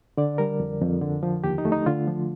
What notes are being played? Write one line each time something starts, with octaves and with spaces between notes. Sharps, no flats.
D3 D5
G3 A#4
F2
F2
D3
F3
D#2 G4
D#4
A3
D#4
D3 F4
F3